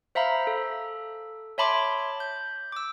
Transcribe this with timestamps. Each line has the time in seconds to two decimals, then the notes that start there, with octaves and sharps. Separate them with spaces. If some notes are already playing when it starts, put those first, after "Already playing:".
0.15 C5 E5 F5 A#5 B5
0.47 A4
1.58 C#5 E5 A5 B5 C6 D6
2.20 G6
2.72 D6 E6